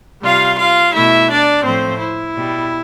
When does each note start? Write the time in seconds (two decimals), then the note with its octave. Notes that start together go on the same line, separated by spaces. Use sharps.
0.23 C3 G3 F4 F5
0.58 F4 F5
0.94 B2 A3 E4 E5
1.30 D4 D5
1.64 A2 F3 A3 C4 C5
2.00 E4
2.36 B2 G3